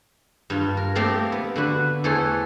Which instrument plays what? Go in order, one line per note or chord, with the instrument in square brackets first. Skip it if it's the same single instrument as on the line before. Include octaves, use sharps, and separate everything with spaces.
[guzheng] G2 F4
A#4
F3 A3 A#3 C4 G4
B3
D3 F#4 B4
E2 E3 A3 A4 C5 C#5